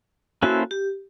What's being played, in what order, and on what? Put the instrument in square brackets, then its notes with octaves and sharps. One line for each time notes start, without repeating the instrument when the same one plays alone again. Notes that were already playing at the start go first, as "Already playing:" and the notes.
[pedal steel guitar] A#3 C#4 E4 A4 C5 [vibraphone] F#4
[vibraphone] G4